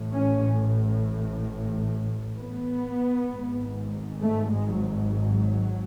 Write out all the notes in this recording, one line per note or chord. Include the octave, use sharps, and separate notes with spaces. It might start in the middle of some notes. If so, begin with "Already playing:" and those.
Already playing: A1 A2
C#4
B3
G#1 G#2
A3
G#3
F#3